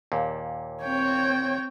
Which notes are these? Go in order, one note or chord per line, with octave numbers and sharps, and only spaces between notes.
D#2 A#2
C4 C#5 G5